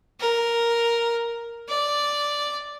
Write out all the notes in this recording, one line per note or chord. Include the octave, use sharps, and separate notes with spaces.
A#4
D5